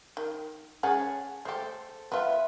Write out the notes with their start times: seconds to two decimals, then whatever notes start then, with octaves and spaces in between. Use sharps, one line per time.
0.17 D#3
0.83 C#4 G#4 C#5 F#5 A5 B5
1.45 A3 G4 A4 C5
2.12 B3 F4 B4 E5